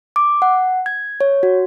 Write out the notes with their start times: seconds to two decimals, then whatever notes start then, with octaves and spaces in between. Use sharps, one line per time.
0.16 D6
0.42 F#5
0.86 G#6
1.21 C#5
1.43 F#4